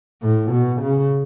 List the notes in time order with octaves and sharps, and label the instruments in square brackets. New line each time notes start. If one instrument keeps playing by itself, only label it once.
[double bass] A2
B2
C#3